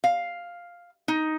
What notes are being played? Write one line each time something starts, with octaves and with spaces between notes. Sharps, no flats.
F5
D#4